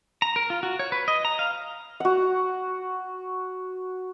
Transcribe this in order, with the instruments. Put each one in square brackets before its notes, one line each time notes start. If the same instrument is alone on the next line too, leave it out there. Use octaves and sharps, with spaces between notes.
[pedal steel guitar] A#5
A#4
F4
F#4
C#5
B4
D#5
A#5
F5
[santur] F#4 F#5